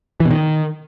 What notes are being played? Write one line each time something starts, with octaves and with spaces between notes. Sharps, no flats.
E3
B2
D#3